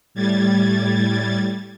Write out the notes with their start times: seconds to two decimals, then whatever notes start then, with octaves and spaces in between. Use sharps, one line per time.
0.14 A2 G3 G#6 A6